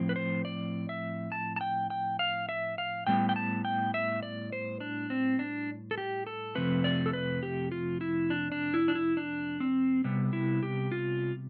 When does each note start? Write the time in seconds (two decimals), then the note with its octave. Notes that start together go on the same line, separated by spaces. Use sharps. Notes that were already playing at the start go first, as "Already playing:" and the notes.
Already playing: A2 F3 C4
0.09 B4
0.16 C5
0.45 D5
0.89 E5
1.32 A5
1.56 A5
1.61 G5
1.90 G5
2.19 F5
2.49 E5
2.78 F5
3.07 A2 G3 B3 G5
3.29 G5
3.36 A5
3.65 G5
3.94 E5
4.23 D5
4.53 C5
4.80 D4
5.10 C4
5.39 D4
5.91 A4
5.98 G4
6.27 A4
6.55 F2 C3 F3 A3 C4 B4
6.84 D5
7.06 A4
7.13 B4
7.43 G4
7.72 F4
8.01 E4
8.30 D4
8.52 D4
8.74 E4
8.88 D4
8.95 E4
9.17 D4
9.60 C4
10.04 C3 G3 B3
10.33 E4
10.63 G4
10.92 F4